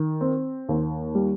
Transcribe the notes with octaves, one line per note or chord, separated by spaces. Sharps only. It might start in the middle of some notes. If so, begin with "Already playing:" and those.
Already playing: D#3
C4
D#2
G3